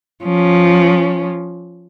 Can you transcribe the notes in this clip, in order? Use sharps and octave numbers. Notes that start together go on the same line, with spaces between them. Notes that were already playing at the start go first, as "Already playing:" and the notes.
F3 C#4